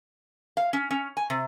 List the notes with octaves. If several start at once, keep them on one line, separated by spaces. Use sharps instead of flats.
F5
C#4
C#4
G#5
C3